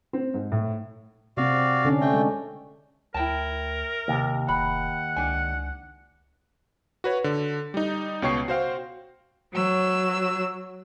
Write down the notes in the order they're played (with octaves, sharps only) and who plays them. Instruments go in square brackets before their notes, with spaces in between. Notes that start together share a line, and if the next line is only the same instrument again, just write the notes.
[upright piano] C4
G#2
A2
[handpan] C3 C4 [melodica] F#4 D5 F5
[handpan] D3 C#4 D4
[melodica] A3 G5
[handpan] G#3
[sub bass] D2 [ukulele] E4 G5 A5 [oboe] A#4
[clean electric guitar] D#2 [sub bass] C3
[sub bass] F1 [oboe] F#5 [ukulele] B5
[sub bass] C#2 [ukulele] D4 G#5
[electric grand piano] F#4 B4 C#5
D3
G3 D#4
C#2 B2 C#5 G5 C#6 C7
F#4 C5 F5 G5
[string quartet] F#3 E6